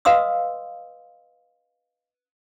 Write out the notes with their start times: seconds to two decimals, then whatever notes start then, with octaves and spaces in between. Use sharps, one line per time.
0.05 B4 D#5 F5 C6 D#6 E6